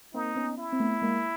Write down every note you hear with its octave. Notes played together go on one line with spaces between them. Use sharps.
A#3 C4 D#4
B3 C#4
E4
C4
A3 B3
G#3 A#3